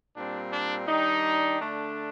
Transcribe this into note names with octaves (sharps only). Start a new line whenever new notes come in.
A#2 G3 C4 D4
D4
D#3 G3 D4 D#4
D3 A3 D4